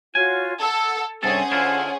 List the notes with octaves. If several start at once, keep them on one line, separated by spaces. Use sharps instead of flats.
F4 F#4 C#5 G#5
A4 F#5 E6
G2 C3 C#4 G#4 A4 C5 F#5 G#5
D3 E4 F4